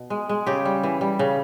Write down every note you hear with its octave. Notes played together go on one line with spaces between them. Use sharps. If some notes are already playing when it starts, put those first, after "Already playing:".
Already playing: B2
G#3
G#3
C#3 G4
G3
E3
G3
C#3